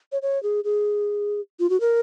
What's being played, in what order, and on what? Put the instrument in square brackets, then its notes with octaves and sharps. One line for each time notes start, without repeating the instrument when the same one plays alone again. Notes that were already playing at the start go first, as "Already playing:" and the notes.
[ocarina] C#5
C#5
G#4
G#4
F4
F#4
A#4